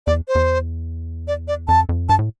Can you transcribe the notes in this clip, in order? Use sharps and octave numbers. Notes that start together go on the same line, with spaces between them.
E2 D5
C5
E2
D5
D5
F2 A5
F2
G2 A5
A2